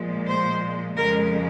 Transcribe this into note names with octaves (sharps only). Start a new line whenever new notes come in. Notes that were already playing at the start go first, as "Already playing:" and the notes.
Already playing: A#2 F3 G#3
C5
F2 C#3 G#3 A#4